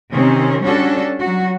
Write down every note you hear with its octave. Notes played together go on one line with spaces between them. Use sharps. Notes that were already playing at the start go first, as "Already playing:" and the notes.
C3 D#3 C4 C#4
G3 C#4 D4 F#4 A4
F#3 F#4